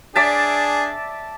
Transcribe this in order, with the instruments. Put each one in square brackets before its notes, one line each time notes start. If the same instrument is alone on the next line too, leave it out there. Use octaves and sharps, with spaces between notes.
[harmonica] D4 G#4 [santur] D5 E5 A5